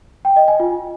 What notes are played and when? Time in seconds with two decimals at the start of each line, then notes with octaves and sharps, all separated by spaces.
0.25 G5
0.36 D#5
0.48 G#5
0.60 F4